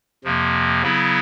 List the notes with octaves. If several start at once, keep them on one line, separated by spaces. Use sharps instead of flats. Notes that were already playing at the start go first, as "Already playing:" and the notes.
F2 C3 F3 A#3
C#3 F#3 B3 E4